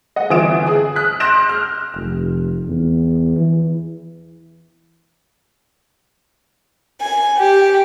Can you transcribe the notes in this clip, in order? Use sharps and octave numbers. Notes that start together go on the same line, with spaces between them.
D#5 F#5
G1 E3 F4 D#6 D7 E7
G#4 D#6
D#6 F6 F#6 B6
C6 F#6 G6 A#6 D7 E7
F6
F1
E2
E3
G#5
G4